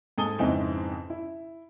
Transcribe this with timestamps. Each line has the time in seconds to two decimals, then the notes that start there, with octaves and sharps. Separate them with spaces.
0.18 G#2 A4 G#5 A5 D#6 G7
0.38 F2 G#2 C#3 E3 C4 D#4
1.10 E4